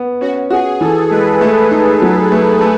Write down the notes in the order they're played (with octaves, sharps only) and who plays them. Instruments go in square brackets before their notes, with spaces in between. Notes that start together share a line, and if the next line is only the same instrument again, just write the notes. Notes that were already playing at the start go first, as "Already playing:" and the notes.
Already playing: [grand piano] B3
[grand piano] C#4 [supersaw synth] F#4
[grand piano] F#4 [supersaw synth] G#4
[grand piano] E3 [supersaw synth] A4
[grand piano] G#3 [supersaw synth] B4
[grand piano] A3
D#4
F#3
A3
A3